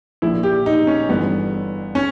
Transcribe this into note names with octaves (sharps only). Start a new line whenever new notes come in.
A#1 A#2 E4
G4
D#4
C#4
G1 G2 E3 B3
C#4